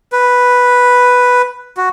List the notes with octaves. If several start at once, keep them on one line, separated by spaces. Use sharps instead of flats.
B4
F#4